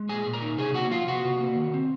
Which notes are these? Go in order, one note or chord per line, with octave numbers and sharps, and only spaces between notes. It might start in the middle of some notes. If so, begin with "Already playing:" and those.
Already playing: G#3
A#2 G#4 G#5
A#2
A#4 A#5
D#4
C3 G#4 G#5
A#3 F#4 F#5
F3 F4 F5
C3 F#4 F#5
C3
A#3
D#3
C4